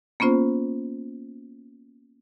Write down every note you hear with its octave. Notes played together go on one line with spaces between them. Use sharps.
A#3 B3 C#4 F4 C5